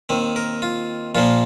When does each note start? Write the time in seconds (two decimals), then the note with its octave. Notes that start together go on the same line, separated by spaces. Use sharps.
0.09 D#2 D#3 C4
0.36 A#4
0.62 F4
1.15 A#1 A#2 F3 A#3 F4